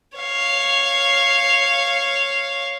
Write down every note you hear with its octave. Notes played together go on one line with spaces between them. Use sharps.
C#5 F5